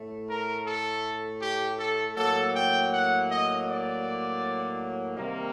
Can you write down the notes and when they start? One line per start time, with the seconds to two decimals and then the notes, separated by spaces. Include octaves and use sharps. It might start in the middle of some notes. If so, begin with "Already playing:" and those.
Already playing: A2 A3
0.28 A#4
0.66 A4
1.40 G4
1.78 A4
2.16 A2 F#3 A#3 A4
2.54 G5
2.92 F#5
3.29 D#5
3.66 D5
5.16 C3 D#3 G3 A#3